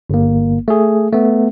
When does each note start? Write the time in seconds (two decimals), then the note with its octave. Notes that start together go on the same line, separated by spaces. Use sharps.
0.10 G1 A#3
0.68 A3 G#4
1.13 A3 B3